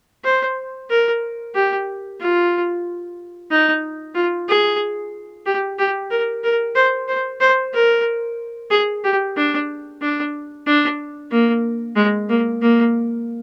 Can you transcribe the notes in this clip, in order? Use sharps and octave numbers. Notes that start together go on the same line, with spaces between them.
C5
A#4
G4
F4
D#4
F4
G#4
G4
G4
A#4
A#4
C5
C5
C5
A#4
G#4
G4
D4
D4
D4
A#3
G#3
A#3
A#3